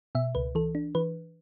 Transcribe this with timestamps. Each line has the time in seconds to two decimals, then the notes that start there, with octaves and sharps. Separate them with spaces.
0.15 B2 E5
0.35 C#2 B4
0.55 E3 A4
0.75 D4
0.95 E3 B4